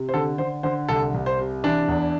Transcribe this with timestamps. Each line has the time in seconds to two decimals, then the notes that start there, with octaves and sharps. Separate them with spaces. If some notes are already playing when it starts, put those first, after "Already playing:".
Already playing: C3
0.09 C5
0.14 D3 A4
0.38 D3 C5
0.63 D3 C5
0.89 C2 A4
1.14 C2
1.26 C5
1.38 C3
1.64 E3 D4
1.88 E2